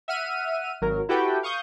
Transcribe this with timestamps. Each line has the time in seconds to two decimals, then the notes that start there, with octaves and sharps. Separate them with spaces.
0.08 E5 F#5 F6 D#7
0.81 G#1 F#3 A#4
1.09 E4 F#4 G4 A4 B4 G5
1.43 F5 C#6 D#6 G6